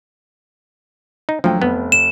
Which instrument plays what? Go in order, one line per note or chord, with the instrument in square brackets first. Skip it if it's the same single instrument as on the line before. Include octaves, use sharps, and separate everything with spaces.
[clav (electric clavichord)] D#4
[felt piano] D2 F#3 G5 [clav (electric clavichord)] F3
[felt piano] F1 [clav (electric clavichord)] B3
[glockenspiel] E7